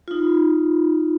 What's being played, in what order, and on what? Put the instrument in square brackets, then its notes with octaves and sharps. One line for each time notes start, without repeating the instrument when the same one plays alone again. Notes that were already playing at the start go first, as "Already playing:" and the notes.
[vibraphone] D#4 F4